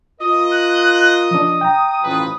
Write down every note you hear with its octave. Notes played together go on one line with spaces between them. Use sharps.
F4 A#4 D#5 D#6
F#6
F3 D4 D#6
G5 A#5
A1 F3 B4